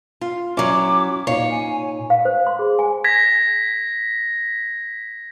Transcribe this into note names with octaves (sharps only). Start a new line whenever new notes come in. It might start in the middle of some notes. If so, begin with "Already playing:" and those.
F4
F#3 C#4 E4 F#4 D6
A#2 D#4 C#5 F5
G#5
F5
C5
C6
G#4
G#5
G#6 A#6 B6